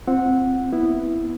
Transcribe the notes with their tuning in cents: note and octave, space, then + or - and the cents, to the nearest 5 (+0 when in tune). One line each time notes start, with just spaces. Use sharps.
C4 +0 F4 -30 F#5 -10
B3 +0 E4 +0